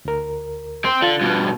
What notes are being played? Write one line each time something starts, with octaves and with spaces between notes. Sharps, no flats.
D2 A#4
C4
D3 F4 A6
G2 B2